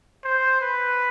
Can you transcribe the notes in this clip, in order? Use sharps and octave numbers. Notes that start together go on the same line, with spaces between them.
C5
B4